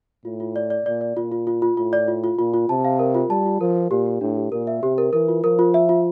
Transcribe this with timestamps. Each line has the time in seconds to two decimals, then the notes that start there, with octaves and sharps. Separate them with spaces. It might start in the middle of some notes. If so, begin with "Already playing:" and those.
0.25 A2 F4
0.40 F4
0.56 D5
0.70 D5
0.86 A#2 D5
1.01 D5
1.16 A#2 F4
1.32 F4
1.47 F4
1.62 F4
1.77 A2 F4
1.93 D5
2.08 F4
2.24 F4
2.38 A#2 F4
2.54 F4
2.69 C3 A5
2.85 F5
2.99 A#4
3.15 F4
3.29 G3 A5
3.46 F4
3.60 F3 A#4
3.76 F4
3.91 A#2 G4
4.06 G4
4.21 A2 D4
4.37 G4
4.52 A#2 A#4
4.67 E5
4.83 C3 G4
4.98 A#4
5.13 E3 A#4
5.28 F4
5.44 F3 A#4
5.59 F4
5.74 E5
5.89 F4